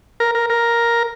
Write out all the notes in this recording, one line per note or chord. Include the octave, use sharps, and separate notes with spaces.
A#4
A#4
A#4